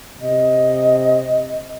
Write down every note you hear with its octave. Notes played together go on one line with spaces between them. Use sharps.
C3 D#5